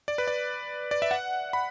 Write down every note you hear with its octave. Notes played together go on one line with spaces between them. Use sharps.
D5
B4
D5
D5
E5
F#5
B5